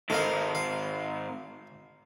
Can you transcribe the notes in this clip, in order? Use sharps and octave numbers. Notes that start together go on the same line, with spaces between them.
G#2 D#3 A4 A#4 F5
F5